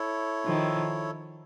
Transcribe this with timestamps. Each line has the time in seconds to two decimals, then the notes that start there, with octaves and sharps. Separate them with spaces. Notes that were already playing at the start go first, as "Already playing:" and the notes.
Already playing: E4 A4 C#5
0.45 D#3 F3